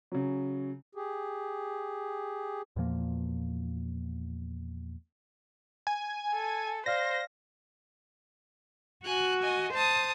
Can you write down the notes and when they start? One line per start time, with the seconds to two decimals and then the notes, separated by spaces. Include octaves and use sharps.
0.12 C#3 F#3
0.95 G4 G#4
2.76 E2 A#2 F3 A#3
5.87 G#5
6.34 A4
6.86 C5 D5 F5 F6 A#6
9.05 F#4 G#5 F#6
9.43 D#5 G#5
9.74 C5 A5 D#6